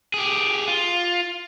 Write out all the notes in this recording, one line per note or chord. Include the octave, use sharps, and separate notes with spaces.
G4 G#4
F4